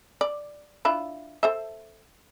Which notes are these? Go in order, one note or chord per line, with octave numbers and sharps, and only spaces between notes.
D5
D4 E4 F4
A4 C5 E5